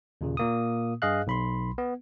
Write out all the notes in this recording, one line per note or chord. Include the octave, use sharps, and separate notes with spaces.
D#2 A#2 C#3
A#2 A#3 D#6
G2 G#4 D#5 F5 F#6
B1 B5 C6
B3